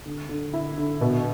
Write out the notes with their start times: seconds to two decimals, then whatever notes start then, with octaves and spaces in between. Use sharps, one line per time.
0.05 D3
0.29 D3
0.54 E4
0.78 D3
1.01 B2